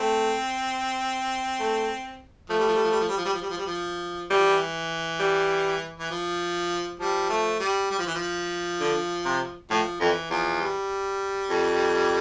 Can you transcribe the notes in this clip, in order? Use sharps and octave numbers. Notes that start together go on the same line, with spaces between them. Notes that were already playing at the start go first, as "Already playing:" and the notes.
Already playing: A3 C4
A3
F3 A3
G3
F3
G3
F3
G3
F3
G3
F3
G3
F3
G3
F3
G3
F3
E3 G3
F3
E3
G3
E3
F3
F3 G3
A3
G3
G3
F3
E3
F3
D3
C3
A2 F3
F2 E3
E2 F3
G3
F2